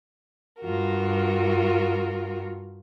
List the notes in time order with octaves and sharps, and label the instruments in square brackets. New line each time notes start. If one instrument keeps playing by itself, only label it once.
[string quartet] G2 F4 F#4 A#4